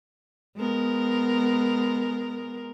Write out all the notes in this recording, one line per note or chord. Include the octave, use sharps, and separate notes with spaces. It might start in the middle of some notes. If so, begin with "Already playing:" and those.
G#3 B3 A#4